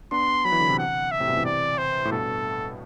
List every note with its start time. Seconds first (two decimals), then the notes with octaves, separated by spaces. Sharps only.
0.11 B3 D4 C6
0.45 F#3 B5
0.52 E3
0.60 D3
0.69 C3 E3
0.78 F#5
1.11 E5
1.20 A2 C3
1.28 G2 B2
1.37 C3 E3
1.45 D5
1.78 C5
2.05 A2
2.11 G2 B2 A4